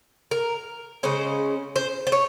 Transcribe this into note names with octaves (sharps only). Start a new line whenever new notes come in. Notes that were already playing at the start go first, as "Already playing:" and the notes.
A#4
C#3 G#3 C#4 C5
C5
C5
C#5